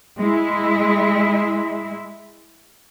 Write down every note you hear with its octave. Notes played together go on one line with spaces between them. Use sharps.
G#3 E4